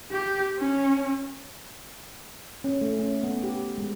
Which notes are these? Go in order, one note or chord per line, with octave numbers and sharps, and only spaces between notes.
G4
C#4
C#4
A3
C#4
B3
G4
G#3